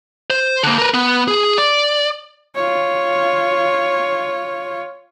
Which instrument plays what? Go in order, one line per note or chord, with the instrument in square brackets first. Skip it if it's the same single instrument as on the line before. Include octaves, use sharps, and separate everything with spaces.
[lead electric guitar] C5
D3 A#3
A#4 B4
B3
G#4
D5
[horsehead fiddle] F4 C#5